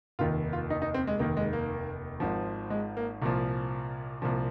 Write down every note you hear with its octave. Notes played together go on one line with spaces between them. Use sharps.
F1 D#2 D#3 F4
F4
D#4
D#4
C4
G#3
F1 D#2 D#3 A#3
G#3
A#3
G#1 G#2 F3
G#3
A#3
C2 A#2 F3
C2 A#2 F3